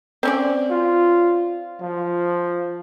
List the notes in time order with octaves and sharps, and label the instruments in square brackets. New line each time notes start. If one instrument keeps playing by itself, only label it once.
[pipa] C4 C#4 D5
[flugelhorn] F4
F3